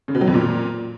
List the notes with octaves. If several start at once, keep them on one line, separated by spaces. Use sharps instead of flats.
C#3
B2
F#3
F2
A#2